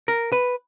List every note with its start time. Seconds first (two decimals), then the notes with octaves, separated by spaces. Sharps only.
0.08 A#4
0.32 B4